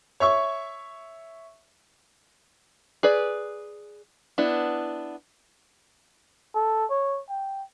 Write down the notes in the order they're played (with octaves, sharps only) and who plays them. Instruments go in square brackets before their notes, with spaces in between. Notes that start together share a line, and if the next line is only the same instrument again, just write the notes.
[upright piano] C#5 E5 C#6
[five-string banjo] G#4 B4 D5
B3 D4 E4
[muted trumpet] A4
C#5
G5